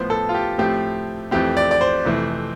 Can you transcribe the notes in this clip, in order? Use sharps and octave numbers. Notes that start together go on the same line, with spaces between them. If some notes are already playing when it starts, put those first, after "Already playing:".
Already playing: A2 F3 B3 C5
A4
F4
G4
A2 F3 A3 C4 G4
F2 E3 A3 C4 G4
D5
D5
C5
F2 C3 E3 A3 C4